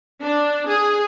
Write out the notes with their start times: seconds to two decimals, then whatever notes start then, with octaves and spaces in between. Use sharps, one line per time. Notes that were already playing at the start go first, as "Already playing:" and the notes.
0.23 D4
0.66 G#4